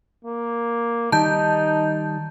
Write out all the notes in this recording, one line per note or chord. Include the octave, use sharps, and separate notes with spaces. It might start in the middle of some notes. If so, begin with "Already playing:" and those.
A#3
D#3 G3 D#4 A5 G6